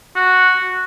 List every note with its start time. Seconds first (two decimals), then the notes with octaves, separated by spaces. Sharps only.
0.16 F#4